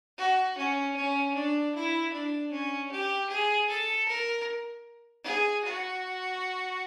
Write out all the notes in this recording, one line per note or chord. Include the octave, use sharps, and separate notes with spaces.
F#4
C#4
C#4
D4
E4
D4
C#4
G4
G#4
A4
A#4
G#4
F#4